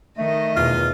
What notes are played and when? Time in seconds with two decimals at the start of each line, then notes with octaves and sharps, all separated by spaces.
0.18 D#3 A3 D#5
0.56 E2 B2 F4